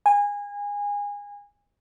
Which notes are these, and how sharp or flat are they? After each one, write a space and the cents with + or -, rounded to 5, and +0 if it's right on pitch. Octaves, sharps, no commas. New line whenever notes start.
G#5 -25